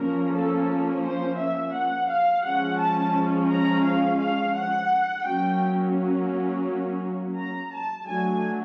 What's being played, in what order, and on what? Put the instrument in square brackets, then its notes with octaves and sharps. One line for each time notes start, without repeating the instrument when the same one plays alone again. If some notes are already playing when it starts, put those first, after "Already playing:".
Already playing: [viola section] F3 A#3 C#4 A#4
A4
C5
E5
F#5
F5
F3 G#3 C#4 F#5
A5
A#5
F5
F5
F#5
F#3 A#3 C#4 G5
A#5
A5
F#3 A3 D4 G#5